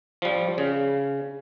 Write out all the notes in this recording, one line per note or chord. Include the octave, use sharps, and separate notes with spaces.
F3 G3
C#3